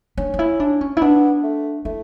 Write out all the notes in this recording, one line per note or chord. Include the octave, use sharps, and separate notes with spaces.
C#4 D4
D4
E4
D4
C#4
E4
B3 D4
A3
A3 E4